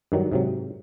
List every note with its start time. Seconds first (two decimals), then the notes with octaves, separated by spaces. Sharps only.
0.12 G2 D#3 F#3
0.32 G#2 C3 F#3